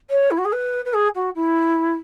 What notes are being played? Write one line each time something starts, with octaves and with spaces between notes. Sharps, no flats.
C#5
E4
F#4
G#4
B4
B4
G#4
F#4
E4